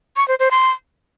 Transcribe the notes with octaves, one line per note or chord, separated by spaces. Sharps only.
C#6
C5
C5
C6